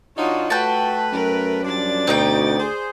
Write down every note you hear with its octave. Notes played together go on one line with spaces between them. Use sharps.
D#3 D4 D#4 F4 F#4 C#5
A3 F#4 B4 G5 A5
F#2 A#4
F3 G3 D4 D5 A6
D2 B2 C4 D#4 G5
G#4 C5